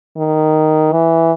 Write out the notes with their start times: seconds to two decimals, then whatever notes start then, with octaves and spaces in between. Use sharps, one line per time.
0.17 D#3
0.92 E3